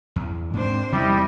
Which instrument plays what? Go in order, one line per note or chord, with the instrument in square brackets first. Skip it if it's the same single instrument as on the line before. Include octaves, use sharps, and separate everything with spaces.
[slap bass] E2
[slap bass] G#2 C4 [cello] D4 C5
[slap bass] E2 C3 [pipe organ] G3 [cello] E4 D#5